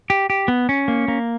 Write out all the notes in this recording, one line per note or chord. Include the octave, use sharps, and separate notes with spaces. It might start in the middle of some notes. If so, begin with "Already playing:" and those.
G4
G4
B3
C#4
A#3
A#3